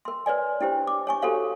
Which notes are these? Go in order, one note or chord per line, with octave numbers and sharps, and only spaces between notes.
A#4 C6
B4 C#5 D5 G#5
D4 E4 G4 C5
D6
C#5 G#5 C#6
F#4 G4 A4 C5 C#5 F5